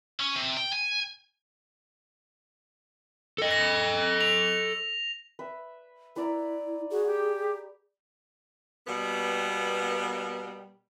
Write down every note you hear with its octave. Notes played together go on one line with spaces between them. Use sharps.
C#4
C3
G5
G#5
A4 D#5
A#6
F7
B4 E5
E4 B4 D5 A#5
F#4 G#4
G4
B2 G3 A#3 B3